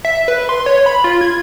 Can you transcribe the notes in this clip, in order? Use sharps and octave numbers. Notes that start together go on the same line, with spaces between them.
E5
B4
C6
C#5
B5
F4
G#6